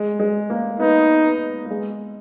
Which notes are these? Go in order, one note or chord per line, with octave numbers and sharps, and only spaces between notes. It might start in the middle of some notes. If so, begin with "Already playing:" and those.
Already playing: G#3
G#3
A#3
B3 D#4
B3
A#3
G#3